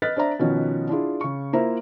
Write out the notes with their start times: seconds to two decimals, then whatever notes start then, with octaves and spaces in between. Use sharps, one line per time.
0.02 B4 D#5 F6 F#6 A6 B6
0.16 D4 C5 D5 E5 A#5
0.39 B2 D#3 F3 C#4
0.89 D4 E4 F4 G#4
1.21 C#3 C#6
1.53 A#3 E4 F4 C5 E5 A#5